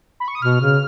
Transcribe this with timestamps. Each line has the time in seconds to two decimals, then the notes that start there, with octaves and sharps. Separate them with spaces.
0.20 B5
0.28 C#6
0.35 D#6
0.42 B2 F6
0.61 C#3